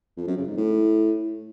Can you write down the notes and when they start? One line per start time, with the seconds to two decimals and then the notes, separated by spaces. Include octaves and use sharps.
0.17 F2
0.27 F#2
0.37 C#3
0.47 G#2
0.57 A2